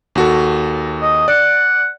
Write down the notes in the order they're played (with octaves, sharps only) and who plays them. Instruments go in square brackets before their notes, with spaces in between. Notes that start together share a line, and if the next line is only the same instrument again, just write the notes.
[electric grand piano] D#2 F#4 A4
[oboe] D#5
[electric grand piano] D5 [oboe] F#5